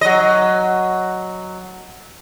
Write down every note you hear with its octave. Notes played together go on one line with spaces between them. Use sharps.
F#3 D#5